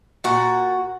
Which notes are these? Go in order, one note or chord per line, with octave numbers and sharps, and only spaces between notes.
A#2 F#4